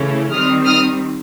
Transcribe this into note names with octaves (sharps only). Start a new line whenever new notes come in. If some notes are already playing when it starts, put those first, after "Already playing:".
Already playing: C#3 E3 A3 C#4 E4
D#3 G3 C4 D#6 F6
D#6 F6